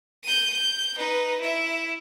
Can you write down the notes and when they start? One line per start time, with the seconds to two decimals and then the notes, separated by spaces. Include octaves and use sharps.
0.24 G6 D#7
0.53 G6
0.97 D#4 B4
1.40 E4 E5